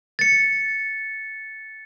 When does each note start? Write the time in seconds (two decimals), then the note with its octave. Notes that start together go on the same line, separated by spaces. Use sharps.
0.19 A6 C#7